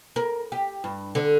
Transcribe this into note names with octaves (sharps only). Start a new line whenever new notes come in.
A#4
G4
G2
D3